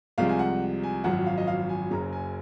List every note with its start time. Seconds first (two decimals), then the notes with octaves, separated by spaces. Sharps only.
0.18 C2 C3 F3 G#3 F5
0.29 G#5
0.39 F#5
0.83 G#5
1.04 G#1 F#2 F3 F#5
1.26 F5
1.38 D#5
1.47 F5
1.69 G#5
1.91 F#1 F#2 C#3 A#5
2.13 G#5